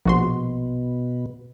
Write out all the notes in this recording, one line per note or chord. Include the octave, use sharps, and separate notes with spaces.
A#1 B2 F#4 C6